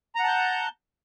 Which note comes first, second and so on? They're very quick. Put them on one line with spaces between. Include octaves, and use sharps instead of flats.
A#5 F#5 A5 G6